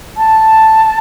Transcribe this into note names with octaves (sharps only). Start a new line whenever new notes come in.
A5